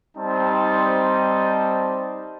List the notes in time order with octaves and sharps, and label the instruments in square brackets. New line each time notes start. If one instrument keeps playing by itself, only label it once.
[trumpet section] G3 C4 D#4 C5 A5